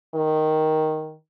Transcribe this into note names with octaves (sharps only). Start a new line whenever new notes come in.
D#3